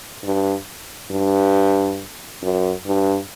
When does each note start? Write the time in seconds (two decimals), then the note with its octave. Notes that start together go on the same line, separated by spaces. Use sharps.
0.24 G2
1.11 G2
2.43 F#2
2.86 G2